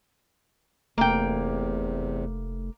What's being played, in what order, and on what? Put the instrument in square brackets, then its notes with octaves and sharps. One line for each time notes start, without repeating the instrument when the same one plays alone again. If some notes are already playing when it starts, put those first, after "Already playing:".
[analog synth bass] F1 [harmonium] E2 C3 [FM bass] A3 [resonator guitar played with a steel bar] A#3 G5